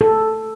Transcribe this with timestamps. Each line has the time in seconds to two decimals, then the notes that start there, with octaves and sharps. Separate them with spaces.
0.01 A4